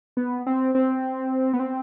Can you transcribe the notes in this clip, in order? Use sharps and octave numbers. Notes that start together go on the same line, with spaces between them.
B3
C4
C4
B3
C4